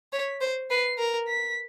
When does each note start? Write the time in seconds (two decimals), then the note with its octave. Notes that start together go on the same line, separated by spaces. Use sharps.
0.13 C#5 B6
0.41 C5
0.70 B4 C7
0.98 A#4
1.28 B6